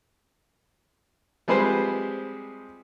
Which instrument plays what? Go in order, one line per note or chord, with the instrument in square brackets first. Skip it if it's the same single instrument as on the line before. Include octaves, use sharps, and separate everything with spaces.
[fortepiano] F3 G3 G#3 C4 B4 C5